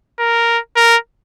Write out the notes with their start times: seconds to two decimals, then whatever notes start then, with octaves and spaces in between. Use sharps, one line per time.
0.19 A#4
0.76 A#4